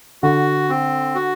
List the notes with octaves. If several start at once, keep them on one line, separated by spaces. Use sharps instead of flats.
D3 F#4
C4
F#4